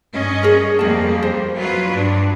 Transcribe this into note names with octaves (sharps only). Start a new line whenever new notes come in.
G2 C#4 D#5
G#4 A#4
F2 G3 A#3 G#4 A5
C5
F#3 F4 B4
G2 D4